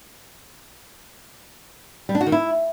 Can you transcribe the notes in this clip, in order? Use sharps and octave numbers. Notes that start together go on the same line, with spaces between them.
G3
D4
F#4
D#3
E4